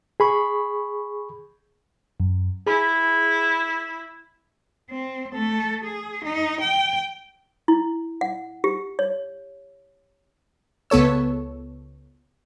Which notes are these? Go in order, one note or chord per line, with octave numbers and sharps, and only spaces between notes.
G#4 B5 C#6
F#2
E4 G#4 B5
C4
A3 A4
G#4
D#4
G5
E4
F#5
G4
C#5
C#2 B3 A4 C#5 E6